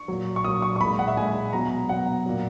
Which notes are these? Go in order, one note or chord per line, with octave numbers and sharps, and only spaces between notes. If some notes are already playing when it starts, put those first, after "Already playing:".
Already playing: C#6
A#2 F#3
C#6
A#2 F#3 D#6
C#6
C#6
A#2 G#3 B5
F#5
E5
A#2 G#3 G#5
B2 F#3 A#5
B2 F#3 F#5
A#2 F#3